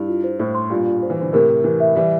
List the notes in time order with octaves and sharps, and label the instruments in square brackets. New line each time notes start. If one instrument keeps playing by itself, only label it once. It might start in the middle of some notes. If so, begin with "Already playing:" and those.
Already playing: [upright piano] G2 [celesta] E4
[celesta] F4
C5
[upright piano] A2 [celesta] C5
[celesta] C6
[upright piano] G2 A#2 [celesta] F4
[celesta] F4
C5
[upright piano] E3
[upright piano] D3 [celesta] C5
[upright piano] A2 C3 [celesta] A#4
[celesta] A#4
[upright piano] C3 E3 [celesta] A#4
[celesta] E5
[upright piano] E3 G3 [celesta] E5